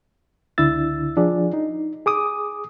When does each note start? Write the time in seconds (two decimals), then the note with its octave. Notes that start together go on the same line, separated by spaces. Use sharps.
0.58 C#2 D3 D4 E4 E6 A6
1.17 F3 D4 F4 G#4 D5
1.53 D#4
2.06 G#4 D6 D#6